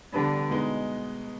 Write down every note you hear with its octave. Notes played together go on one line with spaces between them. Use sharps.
D3 G3 B3 D4 G4 B4
B2 G#3 B3 D#4